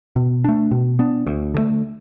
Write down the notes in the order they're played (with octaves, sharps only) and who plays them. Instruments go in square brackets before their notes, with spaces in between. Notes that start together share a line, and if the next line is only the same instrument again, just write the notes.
[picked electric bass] B2
A3 D4
B2
B3 D4
D2
D3 A3